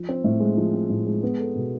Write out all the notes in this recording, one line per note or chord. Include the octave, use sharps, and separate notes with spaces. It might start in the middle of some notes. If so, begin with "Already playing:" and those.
Already playing: F3
C4
A2
G#3
F3
C4
A2
G#3
B3
A4
B2